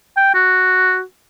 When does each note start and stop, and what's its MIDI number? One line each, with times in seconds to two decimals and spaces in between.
0.17 0.33 79
0.34 1.02 66